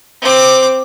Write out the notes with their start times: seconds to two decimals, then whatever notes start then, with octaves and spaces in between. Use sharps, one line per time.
0.22 C4 D6